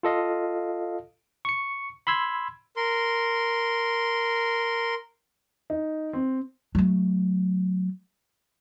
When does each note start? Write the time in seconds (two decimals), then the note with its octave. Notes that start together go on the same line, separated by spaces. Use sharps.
0.03 F4 A4 D#5 F5
1.45 C#6 C#7
2.07 B5 C6 E6 G#6
2.77 A#4 C6
5.70 D#4
6.13 C4
6.75 F#3 A3